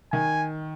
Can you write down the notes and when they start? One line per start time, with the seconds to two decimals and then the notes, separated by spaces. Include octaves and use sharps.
0.12 D#3 G#5